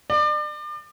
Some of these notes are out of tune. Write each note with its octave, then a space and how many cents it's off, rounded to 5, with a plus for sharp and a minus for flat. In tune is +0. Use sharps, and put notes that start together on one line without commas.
D5 +35